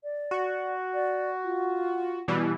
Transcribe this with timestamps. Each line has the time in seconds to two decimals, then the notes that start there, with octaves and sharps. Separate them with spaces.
0.04 D5
0.31 F#4
0.94 D5
1.44 F4
2.28 B2 E3 G3